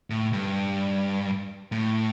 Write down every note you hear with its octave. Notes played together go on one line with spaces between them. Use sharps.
A2
G2
A2